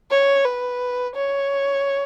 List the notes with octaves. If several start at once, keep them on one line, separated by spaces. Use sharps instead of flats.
C#5
B4
C#5